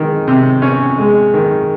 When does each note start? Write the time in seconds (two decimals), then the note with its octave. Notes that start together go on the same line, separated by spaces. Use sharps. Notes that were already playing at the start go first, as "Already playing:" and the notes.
Already playing: D#3 G#3
0.28 C3
0.62 C#4
0.98 G#3
1.34 D#3